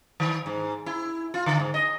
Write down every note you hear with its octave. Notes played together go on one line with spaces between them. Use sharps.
D#3
G#2
E4
F4
D3
G#2
D#5